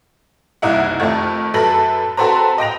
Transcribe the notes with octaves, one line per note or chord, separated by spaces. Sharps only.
F#1 C2 D#4 E4 F#5
F2 D#3 A3
F#2 A4 B4 A#6 F#7
C4 F#4 A4 B4 C5 A#5
D#5 G5 A#6 F7